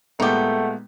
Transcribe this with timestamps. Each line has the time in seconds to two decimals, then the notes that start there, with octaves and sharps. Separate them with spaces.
0.20 A#2 G#3 A3 B3 D#4 G4 F#5